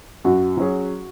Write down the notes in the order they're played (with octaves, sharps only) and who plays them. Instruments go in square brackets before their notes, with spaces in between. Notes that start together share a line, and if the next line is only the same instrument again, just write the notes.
[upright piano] F#2 [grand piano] F#4
[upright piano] F#3 C#4 G#4